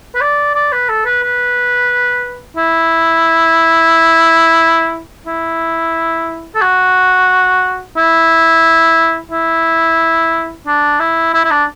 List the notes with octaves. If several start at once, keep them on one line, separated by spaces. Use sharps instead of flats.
B4
D5
D5
B4
A4
B4
B4
E4
E4
A4
F#4
E4
E4
D4
E4
E4
E4
D4